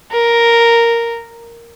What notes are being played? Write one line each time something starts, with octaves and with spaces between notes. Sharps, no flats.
A#4